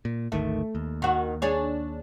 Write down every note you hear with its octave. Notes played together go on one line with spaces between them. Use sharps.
A#2
G#1 D2 D#3 A3
D#2
D#3 F#4
D4 G#4 C#5